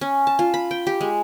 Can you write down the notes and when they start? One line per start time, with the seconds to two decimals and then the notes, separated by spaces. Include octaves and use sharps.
0.01 C#4
0.27 A5
0.39 F4
0.54 B5
0.71 G5
0.87 G4
1.01 G#3